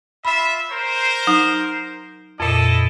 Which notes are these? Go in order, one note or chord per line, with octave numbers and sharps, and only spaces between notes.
F4 E5 B5
A#4 C5
F#3 D#4
F2 A#2 E4 A4 D#5